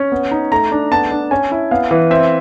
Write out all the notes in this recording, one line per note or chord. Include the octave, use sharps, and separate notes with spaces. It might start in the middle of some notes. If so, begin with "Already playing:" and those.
Already playing: C#4
B3
D#4
A3 A#5
D4
B3 A5
D4
C#4 G#5
E4
B3 F5
E3
C4 E5